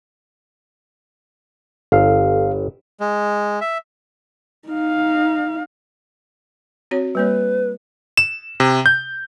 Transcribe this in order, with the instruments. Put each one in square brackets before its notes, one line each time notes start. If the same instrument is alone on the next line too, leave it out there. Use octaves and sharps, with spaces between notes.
[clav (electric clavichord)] G1 [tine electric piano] A4 F5
[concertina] G#3
E5
[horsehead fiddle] D#4 F5
[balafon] C4 F#4 C#5
[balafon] G3 A#3 C#5 [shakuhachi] B4
[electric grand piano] E7
C3
G6